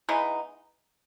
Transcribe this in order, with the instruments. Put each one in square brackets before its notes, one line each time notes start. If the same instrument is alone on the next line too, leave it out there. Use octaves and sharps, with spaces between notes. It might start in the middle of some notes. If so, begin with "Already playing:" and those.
[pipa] E3 G#3 B3 D#4